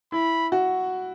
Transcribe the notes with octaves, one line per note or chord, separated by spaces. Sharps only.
E4 B5
F#4